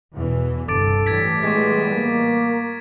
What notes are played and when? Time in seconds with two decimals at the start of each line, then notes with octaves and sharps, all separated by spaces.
0.13 E2 B2 E3
0.68 G1 C2 G2 A4 D6 A6 D7
1.06 A2 E3 G3 G#6 A6 B6
1.43 G#3 B3 C#6 G#6 B6
1.94 A#3
2.40 A#4